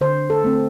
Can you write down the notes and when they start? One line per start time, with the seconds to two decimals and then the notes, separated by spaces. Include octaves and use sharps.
0.01 D3 C5
0.30 A4
0.44 A3 C4